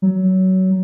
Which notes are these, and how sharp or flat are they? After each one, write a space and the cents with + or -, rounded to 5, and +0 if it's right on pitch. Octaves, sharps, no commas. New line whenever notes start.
F#3 +20